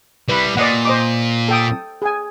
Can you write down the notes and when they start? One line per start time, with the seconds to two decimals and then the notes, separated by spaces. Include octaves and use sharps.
0.29 G3 E4 B4 B5
0.57 A#2 D5 D#5 F#5
0.85 C5 D#5 D6
1.49 A4 G5 D#6
2.02 G#4 G#5